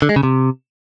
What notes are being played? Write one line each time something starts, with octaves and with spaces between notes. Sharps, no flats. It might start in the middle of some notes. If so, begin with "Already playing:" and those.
D3
G#3
C#3
C3